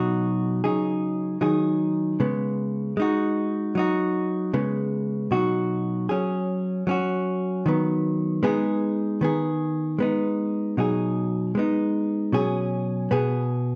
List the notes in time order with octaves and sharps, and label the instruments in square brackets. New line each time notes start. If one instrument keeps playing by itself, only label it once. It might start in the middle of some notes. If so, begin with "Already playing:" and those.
Already playing: [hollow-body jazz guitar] B2 F#3 D#4 F#4
C#3 F#3 D#4 G#4
D#3 F#3 D#4 G#4
C#3 G#3 B3
G#3 D#4 F#4
F#3 D#4 F#4
C#3 G#3 B3
B2 F#3 D#4 F#4
F#3 C#4 G#4
F#3 C#4 F#4
D#3 F#3 B3
G#3 B3 D#4 G#4
D#3 B3 G#4
G#3 B3 D#4
B2 F#3 D#4 G#4
G#3 B3 D#4
B2 F#3 C#4 G#4
B2 B3 G#4